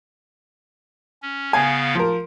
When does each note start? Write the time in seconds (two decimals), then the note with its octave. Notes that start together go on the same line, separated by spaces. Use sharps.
1.22 C#4
1.53 C#3 B3 F5 G#5
1.95 F3 A#4